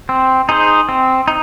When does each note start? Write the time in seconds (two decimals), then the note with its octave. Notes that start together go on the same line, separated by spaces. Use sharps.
0.09 C4
0.49 D#4 G#4 C5
0.89 C4
1.28 D#4